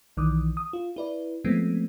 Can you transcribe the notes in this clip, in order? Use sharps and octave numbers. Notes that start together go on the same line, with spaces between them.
B1 D#3 E3 D6 D#6
D#6
F4
E4 B4 D5
F3 G#3 A3 B3 C4